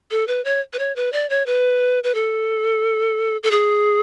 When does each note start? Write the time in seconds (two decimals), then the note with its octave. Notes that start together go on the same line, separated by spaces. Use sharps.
0.11 A4
0.28 B4
0.45 C#5
0.73 B4
0.79 C#5
0.96 B4
1.13 D5
1.30 C#5
1.46 B4
2.04 B4
2.15 A4
3.43 A4
3.51 G#4